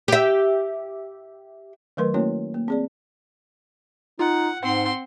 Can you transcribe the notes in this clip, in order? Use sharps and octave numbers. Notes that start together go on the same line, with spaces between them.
G4 E5
D#3 F#3 A3 A#4 B4 C6
A3 A#3 C#4 E4 F#4 C#5
A#3
C4 G#4 D5
D#4 F4 F#5
G#2 C4 F#5 C6